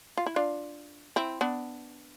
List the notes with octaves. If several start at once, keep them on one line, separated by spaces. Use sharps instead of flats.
F4
E4
D4 F4
C4 E4
B3 D4